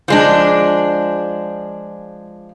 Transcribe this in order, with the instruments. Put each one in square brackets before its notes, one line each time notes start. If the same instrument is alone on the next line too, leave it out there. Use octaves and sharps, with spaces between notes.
[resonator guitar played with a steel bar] F3 G#3 D4